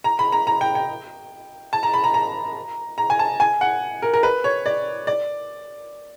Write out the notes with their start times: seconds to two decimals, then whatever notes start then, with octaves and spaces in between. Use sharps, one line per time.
0.04 A#5
0.19 B5
0.32 A#5
0.47 A#5
0.61 G5
0.75 G5
1.73 A5
1.83 A#5
1.94 B5
2.04 A#5
2.14 A#5
2.98 A#5
3.10 G#5
3.19 A5
3.40 G#5
3.61 F#5
4.02 A#4
4.14 A#4
4.23 B4
4.44 C#5
4.66 D5
5.07 D5